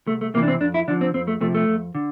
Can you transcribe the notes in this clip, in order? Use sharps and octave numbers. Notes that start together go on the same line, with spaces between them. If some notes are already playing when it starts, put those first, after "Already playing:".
C2 A3
A3
C3 E3 A#3
D4
C4
F2 D4
E4
D3 F3 D4
C4
F2 C4
A3
C3 F3 A3
A3
F2
D3